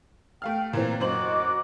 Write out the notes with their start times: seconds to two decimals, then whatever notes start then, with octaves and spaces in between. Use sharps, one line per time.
0.42 A3 F5 G5 F6
0.73 A#2 E3 C4 A#5
1.00 F#2 F#4 C5 D#5 D6 F#7